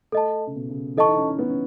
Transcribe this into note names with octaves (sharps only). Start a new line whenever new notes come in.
A3 A4 D#5 A5
C#3
B2
C#3
E3 A4 D#5 A5 C#6
D#4
C#4
C#4
B3
C#4